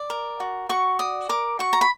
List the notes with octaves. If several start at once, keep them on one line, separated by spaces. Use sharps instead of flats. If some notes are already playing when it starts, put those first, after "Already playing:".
Already playing: D5
A#4
F#4
F#4 C#6
D5 D#6
A#4 D6
F#4 C#6
A#5
B5